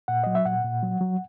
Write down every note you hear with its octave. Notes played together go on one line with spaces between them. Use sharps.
A#2 F#5
F#3 D#5
E5
A#2 F#5
A#2
F#3
F#3